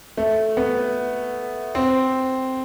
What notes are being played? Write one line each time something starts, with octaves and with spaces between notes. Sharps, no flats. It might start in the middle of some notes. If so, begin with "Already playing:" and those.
A3
B3
C4